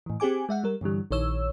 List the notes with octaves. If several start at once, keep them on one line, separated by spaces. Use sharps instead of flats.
A2 E3
C4 G4 G#4 G#5 D6
G#3 E5 F#5
G3 A#4
G2 D3 E3 G3
A#1 D#3 C#5 E6